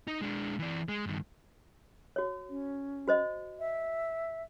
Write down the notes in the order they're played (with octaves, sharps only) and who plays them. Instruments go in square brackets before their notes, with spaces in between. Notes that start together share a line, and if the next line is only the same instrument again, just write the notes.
[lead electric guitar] D#4
G#3 D4
E3 D5
G#3
G2 D#3
[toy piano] F#4 C#5
[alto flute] C#4
[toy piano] F#4 C5 D#5
[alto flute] E5